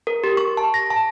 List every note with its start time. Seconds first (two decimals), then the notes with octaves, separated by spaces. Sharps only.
0.07 A#4
0.24 G4
0.37 C#6
0.57 A5
0.74 A#6
0.90 A5